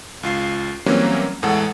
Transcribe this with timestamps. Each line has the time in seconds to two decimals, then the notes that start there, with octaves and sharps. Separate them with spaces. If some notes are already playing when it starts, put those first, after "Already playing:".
0.23 C#2 F4 C7
0.86 E3 F#3 G3 A#3 C4 C#4
1.42 E2 A2 G#3 A4 F#5